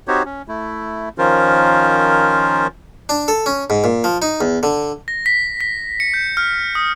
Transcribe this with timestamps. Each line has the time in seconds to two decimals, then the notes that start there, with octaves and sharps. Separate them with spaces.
0.08 C4 D#4 F#4 G4 C5 C#5
0.25 C#4
0.48 A3 E4
1.18 D#3 F3 C#4 F4 A#4 C5
3.09 D4
3.28 A4
3.46 C#4
3.70 G#2
3.84 A#2
4.04 F3
4.22 D#4
4.41 E2
4.63 D3
5.08 A#6
5.26 B6
5.61 B6
6.00 C#7
6.14 G6
6.37 F6
6.75 D#6